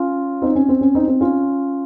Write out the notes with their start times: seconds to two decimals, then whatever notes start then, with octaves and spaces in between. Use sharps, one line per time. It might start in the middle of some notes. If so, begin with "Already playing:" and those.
Already playing: C#4 F4
0.42 C4 D#4
0.55 C#4
0.69 C4
0.81 C#4
0.95 C4 D#4
1.08 C4 D#4
1.21 C#4 F4